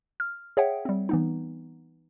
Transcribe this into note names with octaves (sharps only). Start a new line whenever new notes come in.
F6
G#4 C#5 E5 F#5 G5
G3 C4
E3 B3 D#4